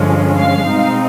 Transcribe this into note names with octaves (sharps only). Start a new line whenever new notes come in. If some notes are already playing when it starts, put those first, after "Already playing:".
Already playing: G2 D3 F3 G#3 C#4
F5
B2 G#3 C4 D#4